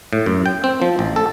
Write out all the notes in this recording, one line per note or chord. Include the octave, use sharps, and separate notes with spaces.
A2
F#2
G5
C4
F3
A1
A4